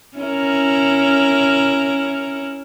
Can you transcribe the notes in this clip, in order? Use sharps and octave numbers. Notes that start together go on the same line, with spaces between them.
C#4 E4 A#4